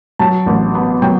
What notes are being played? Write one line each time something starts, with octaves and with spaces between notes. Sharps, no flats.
F#3 A5
A1
B3
F#3 G5